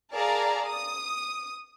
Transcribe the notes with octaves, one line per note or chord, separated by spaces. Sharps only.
G#4 A#4 D5 F5 A5 A#5
D#6